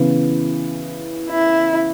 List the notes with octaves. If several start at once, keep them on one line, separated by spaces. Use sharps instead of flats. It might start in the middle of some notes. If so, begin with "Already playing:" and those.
Already playing: C#3 E3 B3
E4